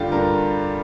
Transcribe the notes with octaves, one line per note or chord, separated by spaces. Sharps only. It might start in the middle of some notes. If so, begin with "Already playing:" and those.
Already playing: G2 D3 G3 F4 G4
G2 A#4